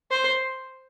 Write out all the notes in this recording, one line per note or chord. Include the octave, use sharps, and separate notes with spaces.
C5